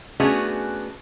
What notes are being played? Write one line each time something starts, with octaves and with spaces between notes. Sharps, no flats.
A3 B3 C#4 D4 F#4 G#4